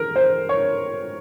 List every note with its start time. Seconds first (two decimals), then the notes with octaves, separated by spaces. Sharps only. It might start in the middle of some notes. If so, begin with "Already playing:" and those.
Already playing: A#4
0.16 C5
0.49 C#5